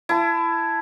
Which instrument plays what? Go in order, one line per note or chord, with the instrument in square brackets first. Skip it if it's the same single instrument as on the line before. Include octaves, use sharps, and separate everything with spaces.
[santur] E4 A5